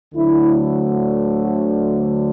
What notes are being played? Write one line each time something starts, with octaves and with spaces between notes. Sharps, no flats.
D2 D3 F#3 A3 E4
F#4